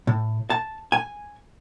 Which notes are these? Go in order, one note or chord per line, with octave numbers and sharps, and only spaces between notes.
A2
A5
G#5